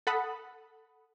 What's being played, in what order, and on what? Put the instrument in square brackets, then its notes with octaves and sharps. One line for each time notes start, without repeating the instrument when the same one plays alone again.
[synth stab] A4 F#5 B5 D#6